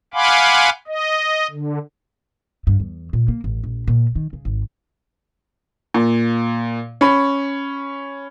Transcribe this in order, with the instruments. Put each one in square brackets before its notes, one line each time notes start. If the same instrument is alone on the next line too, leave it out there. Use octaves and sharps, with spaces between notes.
[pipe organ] F5 F#5 G#5 B5 C6 D6
D#5
D3
[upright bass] G2
E2
A#2
A#3
A1
A#1
A#2
D#3
C#3
G#1
[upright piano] A#2
C#4 B5